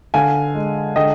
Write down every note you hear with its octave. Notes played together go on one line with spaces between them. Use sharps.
D3 F5 G#5
G#3
D3 D#5 G5